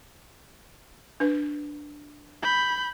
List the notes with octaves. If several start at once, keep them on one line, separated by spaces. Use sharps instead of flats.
D4 B4
B5 G6